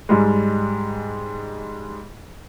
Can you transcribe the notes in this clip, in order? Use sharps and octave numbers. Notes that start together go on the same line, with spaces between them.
G#2 G3 G#3